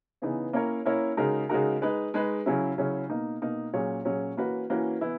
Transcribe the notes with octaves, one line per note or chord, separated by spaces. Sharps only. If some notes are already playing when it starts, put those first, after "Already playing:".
C#3 E3 B3 D#4
A#3 C#4 E4 A#4 C#5
A#3 C#4 E4 A#4 C#5
C#3 G#3 D#4 F#4 A#4
C#3 G#3 D#4 F#4 A#4
G#3 D#4 G#4 B4
G#3 D#4 G#4 B4
C#3 F#3 C#4 E4
C#3 F#3 C#4 E4
B2 A#3 D#4
B2 A#3 D#4
A#2 F#3 C#4 G#4 C#5
A#2 F#3 C#4 G#4 C#5
E3 A#3 C#4 F#4 B4
E3 A#3 C#4 F#4 B4
E3 B3 E4